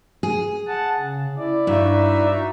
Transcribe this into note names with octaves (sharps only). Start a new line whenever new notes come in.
G#4
F#5 A5
C#3
E4 D5
G2 D#4 F#4 E5